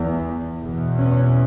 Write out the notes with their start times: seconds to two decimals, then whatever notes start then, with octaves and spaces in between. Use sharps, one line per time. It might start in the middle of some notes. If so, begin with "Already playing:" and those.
Already playing: E2
0.61 E2 B2
0.98 C#4